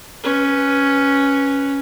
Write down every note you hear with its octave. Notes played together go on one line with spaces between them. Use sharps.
C#4 B4